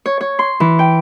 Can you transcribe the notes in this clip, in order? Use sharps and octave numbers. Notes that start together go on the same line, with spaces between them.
C#5
C#5
C6
E3
G5